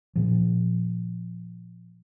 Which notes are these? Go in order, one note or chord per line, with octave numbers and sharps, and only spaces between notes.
A#2 F3